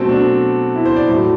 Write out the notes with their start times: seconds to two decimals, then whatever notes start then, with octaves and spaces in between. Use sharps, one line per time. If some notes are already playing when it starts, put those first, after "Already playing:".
Already playing: B2 F#3 A3 C4
0.09 D4
0.75 E4
0.86 C5
0.96 D5
1.07 A2 F#3 A3